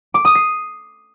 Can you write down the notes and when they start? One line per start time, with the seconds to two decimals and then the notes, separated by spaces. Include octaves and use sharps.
0.14 D6
0.25 D#6
0.35 C7